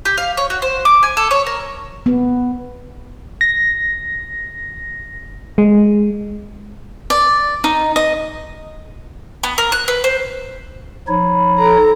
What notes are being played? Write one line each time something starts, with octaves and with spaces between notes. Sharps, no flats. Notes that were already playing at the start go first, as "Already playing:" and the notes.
G4
F5
C#5
F#4
C5
D6
G#5
A4
C#5
A#4
B3
A#6
G#3
D5
D#4
D#5
B3
A#4
F#6
B4
C5
F3 D#4 C#5 B5
A4 A#5